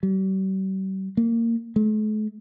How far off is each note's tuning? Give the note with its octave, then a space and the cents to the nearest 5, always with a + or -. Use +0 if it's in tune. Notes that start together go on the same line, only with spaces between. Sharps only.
G3 -45
A#3 -20
A3 -45